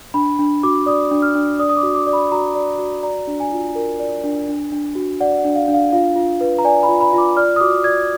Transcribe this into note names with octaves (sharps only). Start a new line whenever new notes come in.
D4 B5
D4
F#4 D6
D5 D#6
D4
F6
D4
D5 D#6
D#6
D6
F#4
D6
D5
B5
F#4 A#5
D5
F#4
D5 A#5
D4
G#5
F4
A#4
D5
D4
D4
D4
F#4
D5 F#5
F#5
D4
F5
D4
F5
F4 F5
F4
B4
A#5
D5 G#5
B5
F4
B5
F4 D6
D5 F6
D#6
F#4 D6
D5 G#6